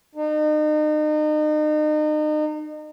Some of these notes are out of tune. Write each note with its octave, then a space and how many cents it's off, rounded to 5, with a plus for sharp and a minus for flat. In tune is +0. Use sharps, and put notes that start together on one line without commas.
D#4 -35